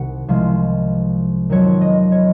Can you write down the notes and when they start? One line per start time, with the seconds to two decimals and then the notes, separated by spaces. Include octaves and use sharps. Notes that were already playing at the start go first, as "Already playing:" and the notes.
Already playing: C2 C3 D#3 F#5
0.28 C2 C3 F3 G#3 F5
1.50 F2 D#3 F#3 C#5
1.81 D#5
2.12 C#5